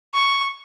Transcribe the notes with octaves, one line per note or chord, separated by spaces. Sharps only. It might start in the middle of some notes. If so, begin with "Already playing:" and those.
C#6